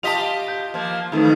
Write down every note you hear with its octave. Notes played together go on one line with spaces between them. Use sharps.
F4 G4 D#5 A5 B6 F7
G6
F3 A#3
F2 D#3 E3 A3 D#4